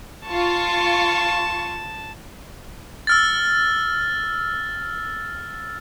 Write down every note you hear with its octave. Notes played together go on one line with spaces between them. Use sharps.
F4 A5 C#6
E6 F6 A6